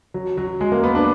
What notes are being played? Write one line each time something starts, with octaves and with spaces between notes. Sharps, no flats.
F#3
F#3
G#3
A#3
B3
D4